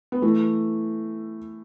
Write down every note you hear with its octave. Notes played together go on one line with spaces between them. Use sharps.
B3
E3 A3